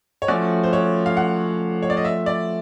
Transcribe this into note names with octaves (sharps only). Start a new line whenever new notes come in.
C#5
F3 A3 C#4 F#4 D5
C5
C#5
F5
F#5
C#5
D5
D#5
E5
D5